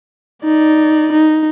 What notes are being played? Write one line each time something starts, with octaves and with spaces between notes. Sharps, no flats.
D#4 D5
D#4